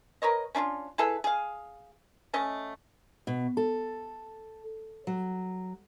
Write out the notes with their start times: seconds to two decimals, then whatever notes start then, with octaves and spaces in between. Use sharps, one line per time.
0.22 A#4 B4 C#5 D#5
0.55 C#4 D4 E4 F4
0.98 E4 G#4 A4 B4
1.24 G#4 F5
2.33 A3 C#4 D#5
3.27 B2
3.57 A4
5.07 F#3